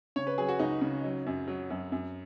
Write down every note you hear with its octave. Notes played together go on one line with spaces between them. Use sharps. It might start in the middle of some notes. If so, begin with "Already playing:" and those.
C#3 C#5
B4
F#3 G#4
F#4
C#2 D#4
C#3
F#3
F#2
F#3
F#2
F#2